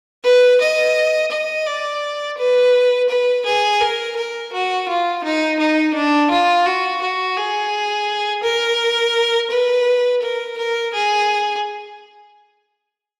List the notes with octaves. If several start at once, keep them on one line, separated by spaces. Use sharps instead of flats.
B4
D#5
D#5
D5
B4
B4
G#4
A#4
A#4
F#4
F4
D#4
D#4
D4
F4
F#4
F#4
G#4
A#4
B4
A#4
A#4
G#4